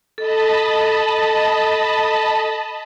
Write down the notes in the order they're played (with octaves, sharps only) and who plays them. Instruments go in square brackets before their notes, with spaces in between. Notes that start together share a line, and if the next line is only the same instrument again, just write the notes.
[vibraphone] A4 [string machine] D#5 A5 B5